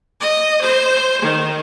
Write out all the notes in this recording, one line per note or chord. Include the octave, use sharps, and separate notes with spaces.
D#5
C5
D#3